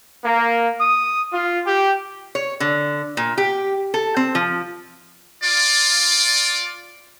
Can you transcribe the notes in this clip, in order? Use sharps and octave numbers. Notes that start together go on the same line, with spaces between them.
A#3
D#6
F4
G4
C#5
D3
A#2
G4
A4
C4
F3
F4 D5